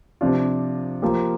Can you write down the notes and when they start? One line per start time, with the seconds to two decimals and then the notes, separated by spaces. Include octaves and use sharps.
0.21 C3 F3 D4 F4
1.02 F3 A#3 G4